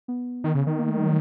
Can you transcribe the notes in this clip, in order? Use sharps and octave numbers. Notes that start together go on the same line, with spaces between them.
B3
D#3
C#3
D#3
A#3
A3
G3
F#3